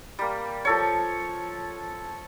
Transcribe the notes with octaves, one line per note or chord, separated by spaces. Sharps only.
G3 A#3
F3 A4 C#5